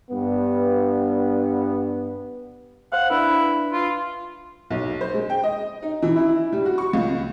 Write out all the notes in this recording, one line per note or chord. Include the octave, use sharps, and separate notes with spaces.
G2 B3
C5 F5 F#5
D4 E4 B4
F4
B1
C5
G#3
G5
D#5
D#4
E3
E4
G3
F#4
C#6
C#2